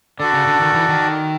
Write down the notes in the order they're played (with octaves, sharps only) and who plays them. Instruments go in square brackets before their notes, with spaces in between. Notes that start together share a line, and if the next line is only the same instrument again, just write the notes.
[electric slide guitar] D3 [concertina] F#4 A4 D5
[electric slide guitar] C#3
D3
D#3
E3
D#3